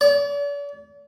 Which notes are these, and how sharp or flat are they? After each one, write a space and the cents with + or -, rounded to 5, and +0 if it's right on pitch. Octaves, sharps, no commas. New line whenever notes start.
D5 -45